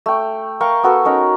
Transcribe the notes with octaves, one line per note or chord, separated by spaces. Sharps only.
A3 G5
A#4 F5 G5 C#6
B3 F#4 A4
C#4 D#4 A#4